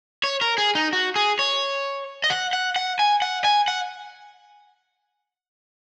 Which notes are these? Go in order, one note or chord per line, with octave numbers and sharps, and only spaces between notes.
C#5
A#4
G#4
D#4
F#4
G#4
C#5
D#5
F#5
F#5
F#5
G#5
F#5
G#5
F#5